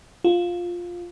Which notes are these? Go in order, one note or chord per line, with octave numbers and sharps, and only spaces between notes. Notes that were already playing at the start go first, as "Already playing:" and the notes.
F4